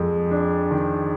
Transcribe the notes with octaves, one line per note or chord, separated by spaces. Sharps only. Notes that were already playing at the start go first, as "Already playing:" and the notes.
Already playing: F2 G#3
D4
D#3